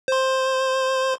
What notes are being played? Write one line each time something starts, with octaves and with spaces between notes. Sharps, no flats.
C5 C6